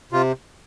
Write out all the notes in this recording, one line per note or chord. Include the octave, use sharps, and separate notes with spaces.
C3 F4